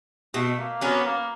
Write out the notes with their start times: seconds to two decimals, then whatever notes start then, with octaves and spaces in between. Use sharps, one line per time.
0.34 B2 A3
0.58 A#3
0.81 F#3 A#3 B3 C#4
1.05 A#3